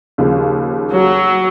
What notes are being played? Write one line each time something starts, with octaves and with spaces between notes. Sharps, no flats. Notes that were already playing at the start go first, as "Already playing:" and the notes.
D#2 C#3 F3
F#3